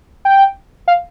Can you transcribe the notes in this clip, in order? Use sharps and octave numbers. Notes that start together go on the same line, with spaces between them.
G5
F5